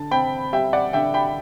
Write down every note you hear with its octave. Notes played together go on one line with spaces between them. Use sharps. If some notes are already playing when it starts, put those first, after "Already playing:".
Already playing: D3 A5
C4 G5 B5
G3 E5 G5
D5 F#5
D3 E5 G5
G5 B5